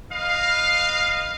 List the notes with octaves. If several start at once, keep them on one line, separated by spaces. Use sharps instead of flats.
B4 D#5 F5